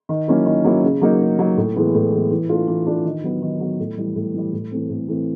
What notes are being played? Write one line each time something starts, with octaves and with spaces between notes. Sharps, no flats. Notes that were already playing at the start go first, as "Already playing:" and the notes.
D#3
F#3 A#3 C#4 E4
D#3
F#3 A#3 C#4 E4
C#3
F#3 A#3 D#4
C#3
F#3 A#3 D#4
A2
E3 G#3 B3
A2
E3 G#3 B3
E3
A3 D4 F4
E3
A3 D4 F4
D#3
F#3 B3
D#3
F#3 B3
A2
E3 G3
A2
E3 G3
A2
E3 A3 C4
A2
E3 A3 C4